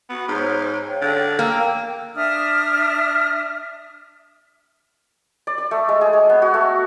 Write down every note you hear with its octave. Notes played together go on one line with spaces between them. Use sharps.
B3 F#4
G#2 C5 C#5
C#5 F5 G5
D3
A#3 G5 A#5 E6
D4 E5 D#6 F6
D5
D5
A3
G#3
G#4
G#3
B3
F#4
A3